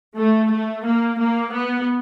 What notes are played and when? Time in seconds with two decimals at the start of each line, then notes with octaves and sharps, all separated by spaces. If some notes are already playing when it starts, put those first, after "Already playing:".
0.17 A3
0.51 A3
0.84 A#3
1.19 A#3
1.52 B3